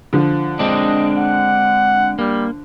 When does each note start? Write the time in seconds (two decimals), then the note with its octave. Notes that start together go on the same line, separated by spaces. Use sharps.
0.13 D3 F3
0.59 G#3 C4 D4 D#5
1.17 F#5
2.19 G3 A#3